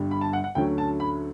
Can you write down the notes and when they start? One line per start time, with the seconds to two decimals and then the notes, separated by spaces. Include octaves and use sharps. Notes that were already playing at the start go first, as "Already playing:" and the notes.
Already playing: G1 G2 D3 G3
0.11 B5
0.21 A5
0.33 F#5
0.44 F#5
0.55 D2 D3 F#3 A3 C#4 G5
0.78 A5
1.00 B5